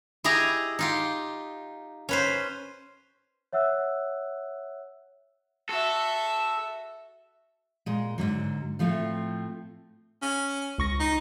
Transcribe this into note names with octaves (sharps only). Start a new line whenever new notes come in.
E4 G4 G#4 D#5 A#5
D#4 F4 G4
C#4 B4 C5
C#5 E5 F#5 E6 F#6
F#4 A4 E5
A#2 G#3
G#2 B2 D3 F#3
A2 F3 A3 C4 F4
C#4
C#2 C#6 A#6
D#4